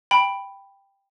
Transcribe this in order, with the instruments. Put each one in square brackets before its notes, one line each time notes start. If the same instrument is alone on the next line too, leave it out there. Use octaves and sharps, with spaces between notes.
[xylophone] G5 B5